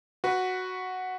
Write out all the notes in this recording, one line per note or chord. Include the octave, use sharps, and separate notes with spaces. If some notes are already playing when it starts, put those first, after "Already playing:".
F#4 B4